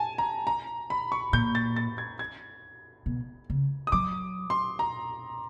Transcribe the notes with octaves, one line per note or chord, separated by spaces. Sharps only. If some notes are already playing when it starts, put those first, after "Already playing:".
Already playing: G#5 A5
A#5
A#5
B5
C#6
A#2 G6
A6
A6
G#6
G#6
B2
C#3
D#6
F#3 D6
C6
A#5